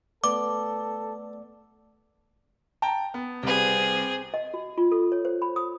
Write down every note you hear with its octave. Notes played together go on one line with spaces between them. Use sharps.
A3 B3 A4 D5 D6
G5 A5 A#5
B3
C2 C4 G#4 B4
D#5
F#4
F4
A4
C#5
C5
B5
D#6